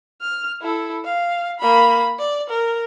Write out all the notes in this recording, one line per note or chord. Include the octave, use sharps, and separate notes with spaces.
F6
E4 A4
F5
A#3 B5
D5
A#4